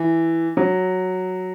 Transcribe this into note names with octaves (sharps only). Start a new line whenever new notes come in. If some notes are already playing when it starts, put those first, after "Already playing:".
Already playing: E3
F#3